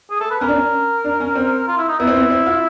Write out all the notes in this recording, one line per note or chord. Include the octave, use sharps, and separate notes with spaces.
G#4
A4
B4
C#4 A#4
D4
C#4
D4
C#4
C4
F4
E4
D#4
B3 E4
C4
B3
C4
F4